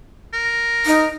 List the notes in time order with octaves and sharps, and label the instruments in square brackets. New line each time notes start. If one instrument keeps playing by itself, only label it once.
[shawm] A#4
[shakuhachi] D#4